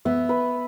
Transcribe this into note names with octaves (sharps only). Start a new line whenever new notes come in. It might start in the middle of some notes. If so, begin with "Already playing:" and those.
B3 E5
B4